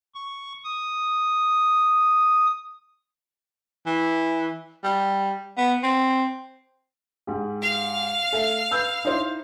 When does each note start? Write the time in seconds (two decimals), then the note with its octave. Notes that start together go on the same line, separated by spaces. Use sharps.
0.15 C#6
0.64 D#6
3.86 E3
4.84 G3
5.57 B3
5.83 C4
7.27 G#2 G4
7.61 F5
8.32 A3 A4 E5
8.71 B4 E6 G6
9.05 D#4 E4 C5